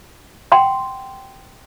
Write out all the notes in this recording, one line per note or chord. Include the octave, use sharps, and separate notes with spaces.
F#5 G5 C6